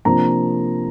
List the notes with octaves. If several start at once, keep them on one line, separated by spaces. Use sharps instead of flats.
C3 F3 A#3 D4 A#5